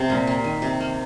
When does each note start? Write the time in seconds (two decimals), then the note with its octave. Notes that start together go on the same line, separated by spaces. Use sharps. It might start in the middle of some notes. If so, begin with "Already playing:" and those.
Already playing: C3
0.09 A#2 A#3
0.27 A#3
0.44 D#3
0.62 C3
0.80 A#3